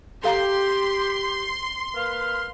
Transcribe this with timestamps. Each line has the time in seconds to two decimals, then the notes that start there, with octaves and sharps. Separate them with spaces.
0.24 G4 A4 F5 A#5 C6
1.94 A#3 B4 F5